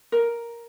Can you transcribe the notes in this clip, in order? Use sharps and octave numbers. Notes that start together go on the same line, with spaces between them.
A#4